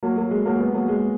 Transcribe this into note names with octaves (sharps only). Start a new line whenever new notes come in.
F#3 A#3
F#3 A#3
G#3
F#3 A#3
G#3 B3
F#3 A#3
G#3